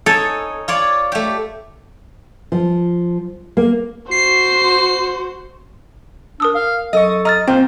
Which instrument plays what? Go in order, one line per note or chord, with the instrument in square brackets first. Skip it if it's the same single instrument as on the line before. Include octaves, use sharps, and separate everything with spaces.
[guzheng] D#4 C#5 G#5 [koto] A4
[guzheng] F4 C#5 D5
A3 G4
[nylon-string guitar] F3
A#3
[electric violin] F#4 C5 [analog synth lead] C7
[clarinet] D4 [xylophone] A#4 D#6 E6
[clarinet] F5
[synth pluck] F#2 C#6 [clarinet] A4 [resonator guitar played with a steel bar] D#5
[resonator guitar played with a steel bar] D#5 [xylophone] A#5 F6 A6
[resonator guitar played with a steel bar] A#2 [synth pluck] C4 [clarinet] C5 [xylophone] G5